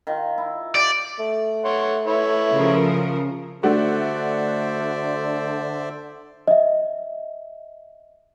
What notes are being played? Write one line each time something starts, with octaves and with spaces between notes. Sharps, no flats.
D#3 F4
E4
G4 D5
A3
C#5 F#5 C6
E4 B4 C#5
C#3 F3 A#4
D3 A3 D4 F#4 C5 D5 E5
D#5 E5